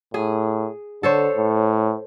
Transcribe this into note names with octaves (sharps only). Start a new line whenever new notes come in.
A2 G#4
D3 A4 C5 C#5
A2